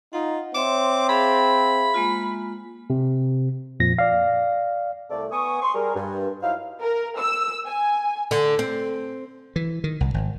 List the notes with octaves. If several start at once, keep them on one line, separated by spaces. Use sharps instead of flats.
D#4 F4 F#5
C4 C#5 E5 C6 D6
G#4 E5 F5 B5
G#3 A#3 F4
C3
F2 A#2 F3 A#6
D5 F5
C2 C3 A3 A4 D5
B3 G#5 C#6 D#6
C6 C#6
G3 G#4 A#4
G2
F#3 D#4 E4 C5 F5
A#4
E6
G#5
D3
C4
E3
D#3
C2
G#1